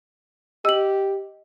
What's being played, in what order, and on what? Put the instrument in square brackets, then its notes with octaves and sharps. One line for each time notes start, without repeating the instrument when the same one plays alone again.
[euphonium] G4 [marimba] D#5 [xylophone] E6 F#7